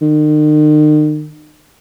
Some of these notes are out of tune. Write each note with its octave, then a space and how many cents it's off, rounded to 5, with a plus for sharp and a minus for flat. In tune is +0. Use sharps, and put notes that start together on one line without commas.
D#3 -40